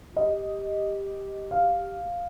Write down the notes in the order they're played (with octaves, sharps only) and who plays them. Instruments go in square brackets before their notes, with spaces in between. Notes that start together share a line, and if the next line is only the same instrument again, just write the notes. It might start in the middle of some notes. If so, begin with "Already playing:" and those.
[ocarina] F4
[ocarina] G4 [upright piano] D#5
[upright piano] F5